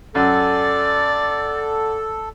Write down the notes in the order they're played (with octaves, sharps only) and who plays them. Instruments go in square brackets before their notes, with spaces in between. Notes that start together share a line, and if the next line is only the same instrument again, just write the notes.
[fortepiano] F#2 [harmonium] A4 [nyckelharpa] D5 [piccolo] A6